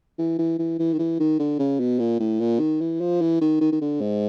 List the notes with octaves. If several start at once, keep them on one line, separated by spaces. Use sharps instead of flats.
E3
E3
E3
E3
D#3
E3
D#3
D3
C#3
B2
A#2
A2
A#2
D#3
E3
F3
E3
D#3
D#3
D#3
D3
G#2